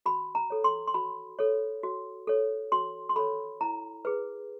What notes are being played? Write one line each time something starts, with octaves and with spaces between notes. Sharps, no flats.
F#4 B5
A#5
A4 C#5
C6
C6
F#4 B5
A4 C#5
F#4
A4 C#5
F#4 C6
C6
A4 C#5 B5
E4 A#5
G#4 B4